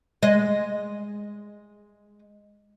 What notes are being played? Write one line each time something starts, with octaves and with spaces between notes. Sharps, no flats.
G#3 D#5